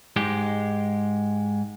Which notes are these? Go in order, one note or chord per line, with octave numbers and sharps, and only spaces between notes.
G#2 G#3 G4